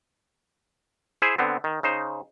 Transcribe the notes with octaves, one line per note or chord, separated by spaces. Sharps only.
E4 G#4 C5 E5
D3 B3 C4
D#3
C#3 D#4 C5